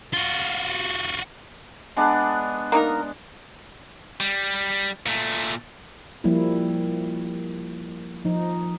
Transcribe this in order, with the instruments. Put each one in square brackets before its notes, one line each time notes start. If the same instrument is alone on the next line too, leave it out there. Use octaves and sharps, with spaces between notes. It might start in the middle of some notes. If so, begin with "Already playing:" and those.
[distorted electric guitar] F4 F#4
[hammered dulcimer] G#3 B3 D4
[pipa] A#3 D#4 A#4
[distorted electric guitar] G3
A#2 A3
[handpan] F3 G3 A#3 E4
F3 D#4